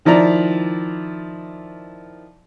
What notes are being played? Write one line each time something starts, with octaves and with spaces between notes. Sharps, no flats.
D#3 F3 E4 D5 A#5